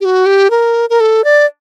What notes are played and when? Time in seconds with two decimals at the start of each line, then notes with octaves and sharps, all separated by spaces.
0.01 G4
0.05 F#4
0.26 G4
0.50 A#4
0.90 A#4
1.00 A4
1.24 D5